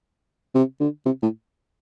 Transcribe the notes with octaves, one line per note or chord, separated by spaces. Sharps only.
C3
D3
C3
A2